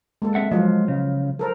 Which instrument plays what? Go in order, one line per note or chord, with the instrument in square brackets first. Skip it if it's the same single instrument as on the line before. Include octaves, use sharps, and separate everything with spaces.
[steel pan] G#3 A#3 A4
[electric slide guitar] C4 E5 F#5
[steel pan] F3 F#3 F4 [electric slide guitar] G#3
[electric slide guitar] C#3
[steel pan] A4 A#4 C5